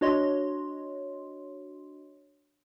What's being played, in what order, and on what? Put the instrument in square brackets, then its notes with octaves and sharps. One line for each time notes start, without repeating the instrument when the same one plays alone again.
[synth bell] D4 F#4 C#5 D#5 C6